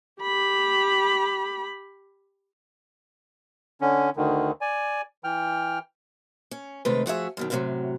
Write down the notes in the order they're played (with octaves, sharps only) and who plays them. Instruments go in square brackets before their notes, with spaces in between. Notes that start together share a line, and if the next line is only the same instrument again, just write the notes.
[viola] G4 B5
[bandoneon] D3 C#4
D2 D3 D#3
D5 G#5
E3 G5 F6
[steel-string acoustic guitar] C#4
C3 D#3 G#3 A3 B4
F3 F#4 G#4 E5
F#2 B2 D#3
F#2 A2 C3 D#3 F#3